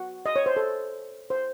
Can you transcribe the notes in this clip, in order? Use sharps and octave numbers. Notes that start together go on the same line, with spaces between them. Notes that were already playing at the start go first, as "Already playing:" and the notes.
Already playing: F#4
D#5
C#5
C5
A4
C5